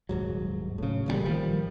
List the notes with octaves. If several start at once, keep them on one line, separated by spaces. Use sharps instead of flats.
D#1 G#2 F#3
A2 C#3
A1 A#2 D#3 G3
G#1 D#3 F3 G3